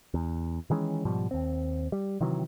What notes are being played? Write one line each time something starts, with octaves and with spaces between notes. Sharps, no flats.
E2
D#3 E3 G#3 C#4
G#2 B2 F3 G3
D#2 C4
G3
C3 D#3 E3 F#3